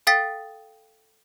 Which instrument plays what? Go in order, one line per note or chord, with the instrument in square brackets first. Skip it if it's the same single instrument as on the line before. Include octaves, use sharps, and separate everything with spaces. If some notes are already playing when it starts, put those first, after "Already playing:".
[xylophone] A4 F5 G5 D#6 A6 B6